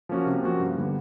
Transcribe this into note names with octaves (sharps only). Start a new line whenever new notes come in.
F3 A#3 C#4 F#4
C3
F3 A#3 C#4 F#4
G2
D3 G3 B3